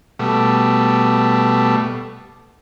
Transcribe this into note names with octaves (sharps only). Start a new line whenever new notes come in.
B2 G3 A3